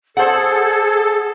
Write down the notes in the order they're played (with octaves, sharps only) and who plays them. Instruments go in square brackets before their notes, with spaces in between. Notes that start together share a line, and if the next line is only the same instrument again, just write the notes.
[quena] G#4 [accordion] A4 [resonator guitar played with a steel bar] C5 F#5